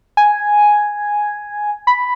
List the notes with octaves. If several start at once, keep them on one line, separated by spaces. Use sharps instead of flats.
G#5
B5